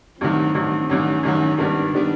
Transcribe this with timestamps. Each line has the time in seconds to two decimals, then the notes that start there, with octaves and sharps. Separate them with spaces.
0.21 A1 G2 D#3 F#3 C4
0.55 A1 G2 D#3 F#3
0.89 A1 G2 D#3 F#3 C#4
1.23 A1 G2 D#3 F#3
1.57 G#1 G2 D#3 G3 B3 D4
1.93 D#3 G3 B3